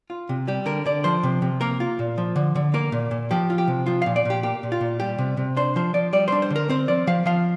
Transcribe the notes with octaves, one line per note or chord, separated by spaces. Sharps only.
F4
C3
G3 G4
D3 A#4
D3 D5
F3 C5
C3
C3
A#3 A#4
F4
A#2
F3
D3
D3
A#3 A#4
A#2
A#2
F3 G4
F4
G4
C3
F3 F4
A#2 F5
D5
A#2 G4
A#3 G4
A#2
F4
A#2
G3 G4
C3
C3
D4 C5
F3 C5
F3 D5
G3 D5
D4 C5
C5
D3
A#4
C4 C5
F3 D5
F3 F5
F3 F5